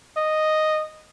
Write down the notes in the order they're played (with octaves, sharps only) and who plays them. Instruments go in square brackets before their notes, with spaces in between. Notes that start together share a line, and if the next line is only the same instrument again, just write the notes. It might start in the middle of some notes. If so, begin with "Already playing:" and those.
[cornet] D#5